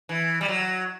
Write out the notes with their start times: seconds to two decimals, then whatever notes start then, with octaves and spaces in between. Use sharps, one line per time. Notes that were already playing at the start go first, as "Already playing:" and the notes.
0.09 E3
0.41 G3
0.48 F#3